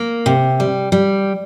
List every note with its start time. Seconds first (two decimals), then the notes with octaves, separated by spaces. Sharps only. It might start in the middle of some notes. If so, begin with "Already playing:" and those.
Already playing: A#3
0.26 C3
0.60 G3
0.92 G3